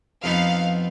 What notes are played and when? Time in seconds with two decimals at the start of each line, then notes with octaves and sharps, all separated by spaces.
0.24 F2 B3 D#4 F5